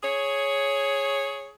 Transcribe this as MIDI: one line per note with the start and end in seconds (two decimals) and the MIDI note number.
0.03 1.53 68
0.03 1.53 73